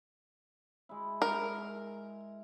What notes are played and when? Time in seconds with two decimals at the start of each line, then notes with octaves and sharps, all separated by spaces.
0.89 G#3 E4
1.22 A#4